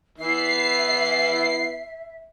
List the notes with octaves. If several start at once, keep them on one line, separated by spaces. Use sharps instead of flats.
E3 B3 E4 E5 C7